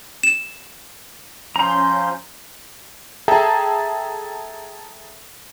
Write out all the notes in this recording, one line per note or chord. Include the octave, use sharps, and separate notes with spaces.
E7
F3 C#4 A#5 C6 G6
G#4 A4 E5 G5 A5 A#5